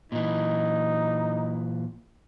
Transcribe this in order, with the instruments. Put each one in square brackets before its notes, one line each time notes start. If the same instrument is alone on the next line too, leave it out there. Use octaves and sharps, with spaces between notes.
[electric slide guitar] A#2 E3 [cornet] D#4